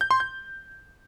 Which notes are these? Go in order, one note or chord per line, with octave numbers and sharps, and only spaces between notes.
G6
C6
G6